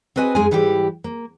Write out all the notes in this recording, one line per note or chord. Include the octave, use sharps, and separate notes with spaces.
C4 F#4 B4 D#5 G#5
F#2 G#3 D#4 G#4 G#5
G#2 E3 G3 E4 G4
A#3